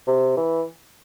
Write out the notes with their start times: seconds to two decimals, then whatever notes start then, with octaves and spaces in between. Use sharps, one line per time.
0.07 C3
0.37 E3